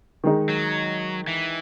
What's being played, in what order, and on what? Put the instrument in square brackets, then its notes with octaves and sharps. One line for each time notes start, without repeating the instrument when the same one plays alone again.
[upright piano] D#3 G#3 D#4
[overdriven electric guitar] F#3
E3